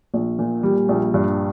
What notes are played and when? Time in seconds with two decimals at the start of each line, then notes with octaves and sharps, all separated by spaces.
0.14 A#1
0.39 A#2
0.63 G3
0.89 A#1
1.14 G2